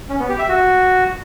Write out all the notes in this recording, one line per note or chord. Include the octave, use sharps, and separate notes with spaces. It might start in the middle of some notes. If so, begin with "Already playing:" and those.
C#4
B3
G4
E5
F#4